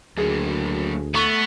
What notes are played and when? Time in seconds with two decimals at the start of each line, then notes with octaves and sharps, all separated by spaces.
0.17 D2 F#3 A#3 G#4
1.14 A3 B3 C#6